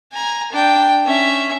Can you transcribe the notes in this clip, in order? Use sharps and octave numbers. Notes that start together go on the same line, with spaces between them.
G#5 A#5
D4 G5
C#4 E5